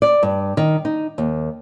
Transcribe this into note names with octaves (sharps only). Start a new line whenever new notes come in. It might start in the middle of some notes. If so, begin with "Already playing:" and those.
D5
G2
D#3
D#4
D#2